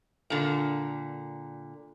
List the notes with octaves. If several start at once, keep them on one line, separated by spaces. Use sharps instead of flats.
A#2 D3